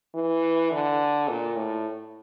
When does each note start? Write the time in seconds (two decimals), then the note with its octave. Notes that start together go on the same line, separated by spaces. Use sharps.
0.14 E3
0.71 D3
1.29 A#2
1.57 A2